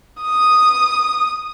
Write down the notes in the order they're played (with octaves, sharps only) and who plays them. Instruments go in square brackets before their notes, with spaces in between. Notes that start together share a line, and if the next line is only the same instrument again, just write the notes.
[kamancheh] D#6